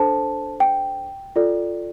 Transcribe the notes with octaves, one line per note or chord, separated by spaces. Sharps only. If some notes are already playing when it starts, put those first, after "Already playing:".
Already playing: D4 A4 C5 A5
G5
F4 A4 D5